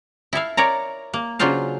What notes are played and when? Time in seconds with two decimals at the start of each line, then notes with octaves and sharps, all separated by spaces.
0.33 E4 A4 E5 F5
0.57 A#4 C#5 D5 A#5
1.14 A#3
1.39 C#3 F#3 D4 F4 C5 F5